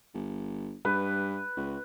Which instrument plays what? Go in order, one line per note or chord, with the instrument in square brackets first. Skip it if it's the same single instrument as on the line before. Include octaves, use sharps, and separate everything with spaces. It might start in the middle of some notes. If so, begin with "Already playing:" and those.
[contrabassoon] G1
[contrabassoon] G2 [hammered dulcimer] B4
[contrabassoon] C#2